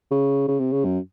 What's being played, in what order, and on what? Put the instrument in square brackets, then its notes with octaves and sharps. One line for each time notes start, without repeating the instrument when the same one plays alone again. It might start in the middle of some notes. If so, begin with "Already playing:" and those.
[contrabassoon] C#3
C#3
C3
C#3
F#2